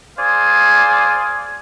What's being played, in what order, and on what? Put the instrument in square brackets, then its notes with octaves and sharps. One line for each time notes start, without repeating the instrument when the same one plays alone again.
[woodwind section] G#4 C5 D5 F5 G#5